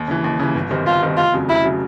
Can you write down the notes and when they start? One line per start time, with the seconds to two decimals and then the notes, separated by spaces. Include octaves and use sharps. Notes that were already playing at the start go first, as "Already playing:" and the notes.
Already playing: D#2
0.08 C#3 E3
0.24 D#2
0.40 C#3 E3
0.55 G1
0.71 F#2 D#3 G3 C4
0.86 G1 F4
1.02 F#2 D#3 G3 C4
1.17 F1 F4
1.33 F2 C#3 F#3
1.49 F1 E4
1.64 C#3 F#3